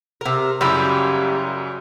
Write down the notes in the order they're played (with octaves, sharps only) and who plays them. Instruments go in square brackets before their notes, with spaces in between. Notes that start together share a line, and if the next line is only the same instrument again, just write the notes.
[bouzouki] C3 A#4
[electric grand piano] F#2 C#3 [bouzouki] G3 A#3 E4